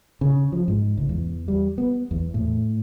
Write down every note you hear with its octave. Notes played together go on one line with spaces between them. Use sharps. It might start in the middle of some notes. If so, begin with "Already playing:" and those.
C#3
F3
G#2
C#2
E2
G3
B3
E2
A2